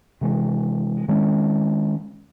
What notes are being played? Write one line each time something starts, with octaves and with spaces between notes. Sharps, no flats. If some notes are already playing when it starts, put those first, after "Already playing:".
C3 E3 G#3
D#3 G#3 C#4